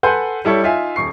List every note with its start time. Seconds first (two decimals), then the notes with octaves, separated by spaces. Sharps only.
0.03 A4 B4 F#5 G#5 C6 G6
0.45 G3 E4 A4 C#5
0.63 D#4 F4 E5 G#5
0.96 D#1 C#6 C7